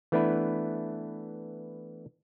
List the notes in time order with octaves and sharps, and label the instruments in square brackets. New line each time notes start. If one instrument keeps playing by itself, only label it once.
[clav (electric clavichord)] E3 A3 B3 D4 E4 B4